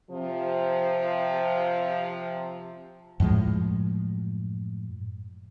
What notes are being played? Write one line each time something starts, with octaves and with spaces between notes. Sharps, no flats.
C3 F3
F#2 A2 F3 G#3